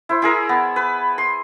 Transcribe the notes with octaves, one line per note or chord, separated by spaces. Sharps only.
E4 C5
E4 G#4 A#4
B3
B4
C6